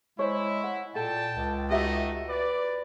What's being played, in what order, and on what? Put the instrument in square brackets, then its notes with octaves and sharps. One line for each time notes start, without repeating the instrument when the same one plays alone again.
[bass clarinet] G#3 [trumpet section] E4 [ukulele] C5 C#5
[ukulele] F#5
[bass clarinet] A#2 [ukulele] A4 [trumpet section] G5 A5
[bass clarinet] C#2
[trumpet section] A3 D#4 D#5 [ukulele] F#4 G4 E5
[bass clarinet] B4 [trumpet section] D5